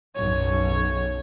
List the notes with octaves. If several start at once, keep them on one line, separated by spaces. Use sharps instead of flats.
B1 F#2 C#5